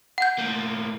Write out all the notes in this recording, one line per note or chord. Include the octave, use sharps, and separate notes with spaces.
F#5 G6
A2 A#3